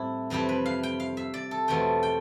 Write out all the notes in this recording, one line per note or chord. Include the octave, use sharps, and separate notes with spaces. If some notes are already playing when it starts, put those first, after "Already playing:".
Already playing: A2 G3 C4 D4 E4
F2 C3 E3 G3 G4
B4
F5
G5
F5
E5
D5
A4
E2 B2 A3 C4 G5
G5